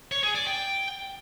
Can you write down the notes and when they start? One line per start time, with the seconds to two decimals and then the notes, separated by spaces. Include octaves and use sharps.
0.12 C#5
0.23 G#4
0.35 D5
0.47 G5